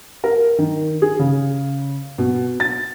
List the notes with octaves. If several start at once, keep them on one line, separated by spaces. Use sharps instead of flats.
A#4
D#3
G#4
C#3
B2
A6